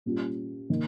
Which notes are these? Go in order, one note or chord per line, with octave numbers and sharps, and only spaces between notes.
A#2 G3 C#4 F4
D#3 A#3